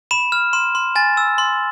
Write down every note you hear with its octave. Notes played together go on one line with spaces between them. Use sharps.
B5 E7
F6
C6 E7
C6
G#5 A6
E6
C6